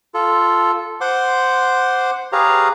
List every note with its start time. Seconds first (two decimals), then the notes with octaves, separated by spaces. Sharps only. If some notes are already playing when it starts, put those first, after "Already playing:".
0.14 F4 A4
1.01 C5 F#5 C6 D6
2.32 G4 G#4 B4 C#5 F5 A#5